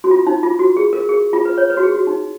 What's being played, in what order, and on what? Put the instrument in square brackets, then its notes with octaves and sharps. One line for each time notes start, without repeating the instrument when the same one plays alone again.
[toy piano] F#4
F4
D#4
F4
F#4
G#4
A#4
G#4
F4
B4
C#5
B4
F#4
G#4
F#4
D#4